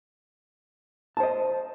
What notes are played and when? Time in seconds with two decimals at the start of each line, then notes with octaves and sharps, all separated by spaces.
1.17 A5
1.20 C5
1.23 D#5